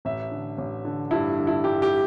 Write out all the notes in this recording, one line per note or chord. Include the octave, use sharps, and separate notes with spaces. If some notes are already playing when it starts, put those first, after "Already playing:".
A1 E5
D3
A1
D3
G2 E4
D3
E4
G2 G4
G4